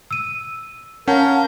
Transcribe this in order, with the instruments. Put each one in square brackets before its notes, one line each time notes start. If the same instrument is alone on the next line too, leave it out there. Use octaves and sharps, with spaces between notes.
[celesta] E6 D#7
[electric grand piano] C#4 [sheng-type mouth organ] A#4 G6 [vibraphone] F5 A5 [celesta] F#5